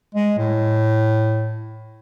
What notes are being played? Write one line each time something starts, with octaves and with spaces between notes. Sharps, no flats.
G#3
A2